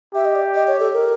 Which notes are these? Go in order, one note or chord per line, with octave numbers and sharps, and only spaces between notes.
G4 E5
D#5
D5
D#5
C#5
A4
A#4